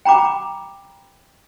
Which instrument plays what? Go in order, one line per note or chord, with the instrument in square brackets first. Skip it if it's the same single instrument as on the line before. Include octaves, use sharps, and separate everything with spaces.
[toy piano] G5 A#5 B5 D6